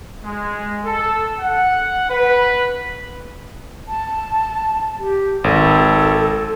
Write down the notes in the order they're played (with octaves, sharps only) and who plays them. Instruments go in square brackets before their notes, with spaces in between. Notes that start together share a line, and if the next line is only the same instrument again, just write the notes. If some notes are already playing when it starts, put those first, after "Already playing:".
[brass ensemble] G#3
A4
F#5
B4
[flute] A5
G4
[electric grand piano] G#1 [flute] A4